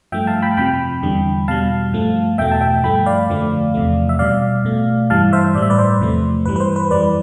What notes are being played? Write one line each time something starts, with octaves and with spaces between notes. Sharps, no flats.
G2 F3 A3 E5 G5
F5 A5
G5 B5
F2 C3 F3 G5 B5
E2 D3 G3
E2 B2 G3 F5 A5
G2 F3 A3
E2 B2 A3 E5 G5
A5
E5 G5
G2 F3 A3 G5 B5
D5 F5
F2 D3 F3 A3
E2 C3 F3 A3
E5
B2 G3 D5 F5
B2 A3
G2 E3 G3 F5 A5
C5 E5
A2 G3 D5
E5
B4 D5
C5
E2 C3 F3 A3
G2 E3 G3 B4
B4
C5
B4
F2 E3 G3 B4 D5